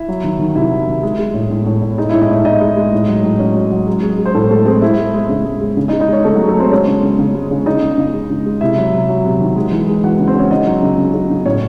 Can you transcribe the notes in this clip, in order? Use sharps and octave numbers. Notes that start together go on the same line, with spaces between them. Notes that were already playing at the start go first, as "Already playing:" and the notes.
Already playing: E4 E5
F#3
D#3
D#3
C3 E4 E5
F#3
D#3
G#3
G#3
A2
A2
A2
A2
G#3 D#4 D#5
A2 E4 E5
D#4 D#5
A2 E4 E5
A2 D#4 D#5
G#3
G#3
A2
F#3
A2
F#3 C#4 C#5
F#3
F#3
G#3
G#3
G#3
C5
A2 A3 A4
G#3 A3 A4
G#3 C4 C5
G#3 E4 E5
G#3
G#3
C#3
G#3
G#3
C#3
D#4 D#5
G#3
D#4 D#5
G#3 C#4 C#5
C#3 A3 A4
F#3 G#3 F#4
A3 A4
G#3 C4 C5
G#3 C#4 C#5
C#3
C#3
C#3
G#3
C#3
C#3 D#4 D#5
C#3
C#3
G#3
C#3
G#3
C3 E4 E5
F#3
C3
F#3
C3
D#3
G#3
E3
G#3
E3 F#4 F#5
C#3
C4 C5
C#3 C#4 C#5
C#3 D#4 D#5
F#3
C#3
C#3
C#3
C#3
A2 C#4 C#5